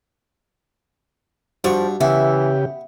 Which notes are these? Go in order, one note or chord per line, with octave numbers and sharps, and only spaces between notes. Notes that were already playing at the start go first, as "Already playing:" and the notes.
G2 F3 F#4 C#6
C#3 E3 B3 G4 E5